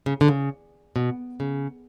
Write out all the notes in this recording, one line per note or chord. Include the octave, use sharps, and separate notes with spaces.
C#3
D3
C#3
B2
C#3